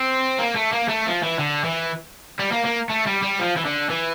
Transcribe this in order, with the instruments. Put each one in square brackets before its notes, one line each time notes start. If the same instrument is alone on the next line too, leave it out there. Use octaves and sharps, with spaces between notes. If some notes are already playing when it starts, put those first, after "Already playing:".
Already playing: [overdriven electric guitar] C4
A#3
A3
A#3
A3
F3
E3
D3
E3
G3
A#3
A#3
A3
G3
G3
F3
E3
D3
E3